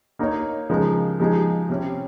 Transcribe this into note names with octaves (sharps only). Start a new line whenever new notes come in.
A#3 D#4 A#4 C#5
C#3 F3 G#3 D#4 A#4
F3 G#3 D#4 G#4
C3 G3 C#4